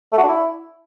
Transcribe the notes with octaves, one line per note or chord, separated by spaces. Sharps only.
A3
F#4
D4
E4